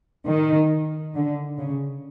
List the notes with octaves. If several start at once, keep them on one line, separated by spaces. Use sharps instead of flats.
D#3
D3
C#3